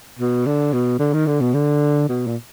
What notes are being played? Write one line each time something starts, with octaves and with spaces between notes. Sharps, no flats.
B2
D3
B2
D3
D#3
D3
B2
D3
B2
A#2